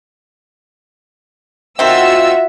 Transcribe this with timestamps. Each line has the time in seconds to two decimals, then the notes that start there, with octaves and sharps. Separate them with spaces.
1.79 D#3 C4 F4 F#4 E5 E6